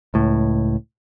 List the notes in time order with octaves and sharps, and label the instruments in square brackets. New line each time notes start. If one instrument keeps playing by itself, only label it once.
[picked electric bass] C#2 A2